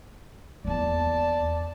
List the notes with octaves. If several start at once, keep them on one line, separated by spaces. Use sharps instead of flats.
E2 A#3 D5 A5